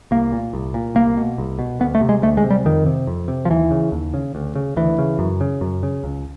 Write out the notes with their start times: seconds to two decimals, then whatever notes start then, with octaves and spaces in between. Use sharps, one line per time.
0.11 C2 A#3
0.32 A#2
0.53 C2
0.74 A#2
0.95 C2 A#3
1.17 B2
1.38 C2
1.59 B2
1.80 D2 B3
1.95 A3
2.01 C3
2.09 G#3
2.22 D2 A3
2.37 G#3
2.44 C3
2.51 G3
2.65 F2 D#3
2.86 C3
3.07 F2
3.28 C3
3.45 F3
3.50 D#2 E3
3.71 C#3
3.92 D#2
4.14 C#3
4.35 D2
4.55 C#3
4.76 D2 E3
4.99 C#3
5.19 F#2
5.41 C#3
5.61 F#2
5.83 C#3
6.04 C#2